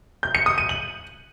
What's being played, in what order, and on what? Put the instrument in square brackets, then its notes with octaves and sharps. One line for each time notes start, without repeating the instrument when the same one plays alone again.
[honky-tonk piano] G6
C#7
D#6
D#7
F#7